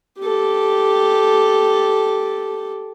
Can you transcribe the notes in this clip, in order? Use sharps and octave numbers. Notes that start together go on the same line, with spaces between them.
G4 A4